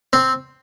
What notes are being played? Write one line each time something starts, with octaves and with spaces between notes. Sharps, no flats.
C4